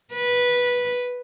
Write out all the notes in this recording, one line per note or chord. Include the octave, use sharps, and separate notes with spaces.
B4